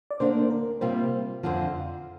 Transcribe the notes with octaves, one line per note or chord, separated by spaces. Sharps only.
D5
D2 D3 A#3 D4 C5
A#4
C3 G3 A#3 F4 C5
F2 D3 F3